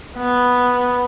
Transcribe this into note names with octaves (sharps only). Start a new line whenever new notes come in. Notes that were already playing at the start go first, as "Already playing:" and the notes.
B3